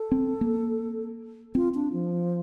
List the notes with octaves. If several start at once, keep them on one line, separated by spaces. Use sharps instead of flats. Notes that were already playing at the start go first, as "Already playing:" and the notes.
Already playing: A4
C4
A#3
C4 F4
D4
F3